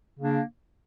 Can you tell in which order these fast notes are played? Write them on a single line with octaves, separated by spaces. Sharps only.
C#3 A#3 D4